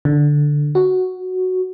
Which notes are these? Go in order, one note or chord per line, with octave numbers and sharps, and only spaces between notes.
D3
F#4